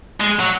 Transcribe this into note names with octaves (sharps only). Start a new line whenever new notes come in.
G#3
F#3